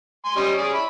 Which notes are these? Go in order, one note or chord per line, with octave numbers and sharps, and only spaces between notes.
G#5 C6
G3 C#4 D#5
C#4 G#4 D5
E5 B5